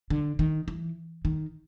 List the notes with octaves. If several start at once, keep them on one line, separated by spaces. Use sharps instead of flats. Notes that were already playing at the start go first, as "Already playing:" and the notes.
D3
D#3
E3
D#3